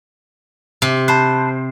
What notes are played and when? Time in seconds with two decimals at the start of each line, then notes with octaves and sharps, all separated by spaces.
0.82 C3
1.08 C5 A5 B5 F#6